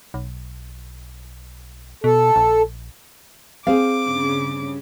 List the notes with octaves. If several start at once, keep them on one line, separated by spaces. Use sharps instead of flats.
B1
B2 A4
A#1
C4 G#4 C5 F5 D6
G2 C#3